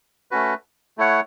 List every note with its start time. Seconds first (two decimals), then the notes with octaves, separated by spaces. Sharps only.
0.31 A3 C#4 F#4 B4
0.98 A3 E4 C#5 F#5